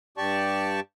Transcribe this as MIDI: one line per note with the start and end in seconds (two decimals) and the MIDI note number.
0.18 0.80 43
0.18 0.80 67
0.18 0.80 74
0.18 0.80 81
0.18 0.80 85